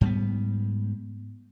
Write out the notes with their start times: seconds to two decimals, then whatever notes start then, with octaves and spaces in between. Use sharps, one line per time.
0.01 G#2 G3 G#3 B3